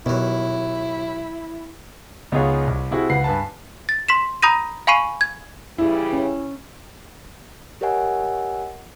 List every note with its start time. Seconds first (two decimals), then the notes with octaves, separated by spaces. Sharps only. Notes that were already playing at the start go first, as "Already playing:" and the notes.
0.06 D#2 B2 F#3 E4
2.32 C#2 B3 D#4 F4 G#4 C#5
2.67 C2
2.91 C3 E4 F#4 G#4
3.09 C#2 B4 F#5 C7
3.24 G2 B4 G#5 A5
3.89 A6
4.09 C6 B6 E7
4.42 A#5 B5 D#6 G6 A#6 D#7
4.87 F5 G#5 B5 C#6 C7 D#7
5.21 G#6
5.78 C#3 E3 G3 E4
6.13 C#4
7.81 G4 A#4 C#5 D#5 F#5 G#5